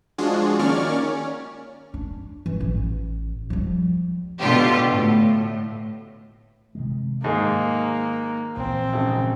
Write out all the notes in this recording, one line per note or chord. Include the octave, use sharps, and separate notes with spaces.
F3 G#3 D4 F4 F#4 G#4
D#3 A#3 C#4 D5 C#6 F6
C#4
D4
E3
A1
F3 G3
B2 D3 F4 G4
A2
C3 D#3 G#3
G#2 D#3 A#3 G#4
A#1 A#2 E3 C4
G#1 C#3